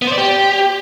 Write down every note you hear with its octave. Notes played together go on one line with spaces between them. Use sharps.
B3
C5
D5
G4